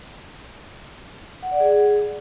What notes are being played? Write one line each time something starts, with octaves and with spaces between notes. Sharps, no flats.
F#5
D5
G#4